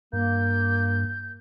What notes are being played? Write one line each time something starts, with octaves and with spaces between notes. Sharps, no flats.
G2 A#3 G6